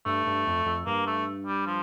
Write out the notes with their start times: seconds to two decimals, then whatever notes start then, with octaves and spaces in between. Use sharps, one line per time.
0.06 G2 A3
0.27 G2
0.47 F2
0.66 F2
0.86 G2 A#3
1.07 A3
1.47 G3
1.67 F3